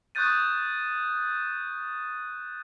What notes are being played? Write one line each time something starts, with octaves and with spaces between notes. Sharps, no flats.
C#6 D#6 F#6 G6 A6 D#7